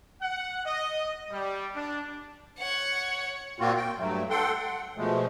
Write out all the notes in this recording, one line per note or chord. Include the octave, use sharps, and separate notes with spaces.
F#5
D#5
G3
D4
C#5 F#5
A#2 A#3 C4 F4 F#4
G5
G2 F#3 A3
A4 F#5 G5 C6
F#5
B2 F3 G#3 A3